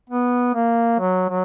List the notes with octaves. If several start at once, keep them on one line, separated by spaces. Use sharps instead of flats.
B3
A#3
F#3
F#3